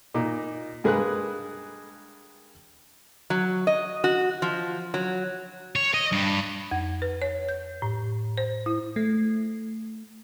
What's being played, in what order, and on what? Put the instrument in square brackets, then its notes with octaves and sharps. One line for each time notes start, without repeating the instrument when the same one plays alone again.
[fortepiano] A#2 D#4
G2 G#3 A#3 G#4 B4 F#6
[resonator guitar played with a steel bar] F#3
D#5
F#4
F3
F#3
[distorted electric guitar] C#5
D#5
G2
[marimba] F2
B4
C#5
G6
A2
C5
E4
[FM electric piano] A3